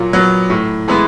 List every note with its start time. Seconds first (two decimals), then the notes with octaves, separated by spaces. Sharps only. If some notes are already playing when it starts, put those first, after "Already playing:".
Already playing: A#2 F#3
0.13 F#3 B3
0.50 A2
0.88 E3 G#3 B3 E4